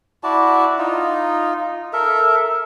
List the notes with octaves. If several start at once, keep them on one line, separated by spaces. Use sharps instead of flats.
E4 F#4 D5 A5
D#4 F4
A4 A#4 E5